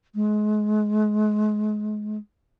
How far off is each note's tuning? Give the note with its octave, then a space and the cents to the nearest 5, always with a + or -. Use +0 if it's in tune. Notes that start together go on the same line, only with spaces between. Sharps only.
G#3 +30